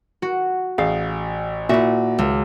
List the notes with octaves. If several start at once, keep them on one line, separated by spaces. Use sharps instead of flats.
F#4
A1 G#4 F5
A#2 E4 F#4 E5
C#2